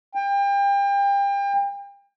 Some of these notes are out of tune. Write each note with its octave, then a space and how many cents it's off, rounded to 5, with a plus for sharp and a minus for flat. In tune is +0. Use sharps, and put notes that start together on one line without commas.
G5 +35